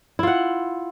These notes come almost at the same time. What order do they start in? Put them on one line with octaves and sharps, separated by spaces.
E4 F4 F#5